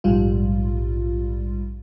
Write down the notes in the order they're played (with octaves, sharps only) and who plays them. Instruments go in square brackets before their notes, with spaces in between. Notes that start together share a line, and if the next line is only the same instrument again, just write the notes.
[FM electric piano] A#1 G#2 G3 F4